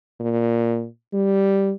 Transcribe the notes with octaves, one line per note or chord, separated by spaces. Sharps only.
A#2
G3